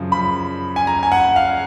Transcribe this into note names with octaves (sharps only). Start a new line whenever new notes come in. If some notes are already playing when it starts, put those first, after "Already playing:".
Already playing: F#2 C#3 F3
B5
G#5
A#5
G#5
F#5
F5